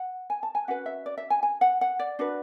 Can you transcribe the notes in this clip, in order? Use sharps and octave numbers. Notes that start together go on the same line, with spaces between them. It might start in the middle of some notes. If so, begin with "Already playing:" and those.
Already playing: F#5
G#5
A5
G#5
C#4 F#4 B4 F#5
E5
D5
E5
G#5
G#5
F#5
F#5
D5
D4 F#4 B4